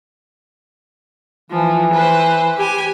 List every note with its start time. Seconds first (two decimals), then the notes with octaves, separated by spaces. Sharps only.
1.51 E3 F3
1.93 B4 C5
2.58 G4 G#5